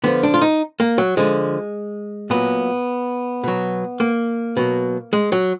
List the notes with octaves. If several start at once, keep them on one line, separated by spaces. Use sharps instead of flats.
D3 F3 B3
D4
F4
D#4
A#3
F#3
D3 F3 G#3
A#2 F#3 B3
B2 F#3
A#3
B2 F#3
G#3
F#3